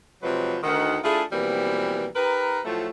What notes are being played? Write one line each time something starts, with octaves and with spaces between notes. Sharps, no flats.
C3 F3 F#3 G#3 B4
D2 D#3 F#5
A3 D4 E4 F4 G#4
B2 E3 F3 G3 A#3 C4
D#4 G4 A#4 B4
A2 F3 F#3 A3